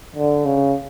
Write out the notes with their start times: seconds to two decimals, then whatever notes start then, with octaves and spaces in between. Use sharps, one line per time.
0.16 D3
0.45 C#3